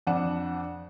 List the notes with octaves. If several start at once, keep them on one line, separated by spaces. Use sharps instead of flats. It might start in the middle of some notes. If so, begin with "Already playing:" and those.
F2 D4 F#5 E7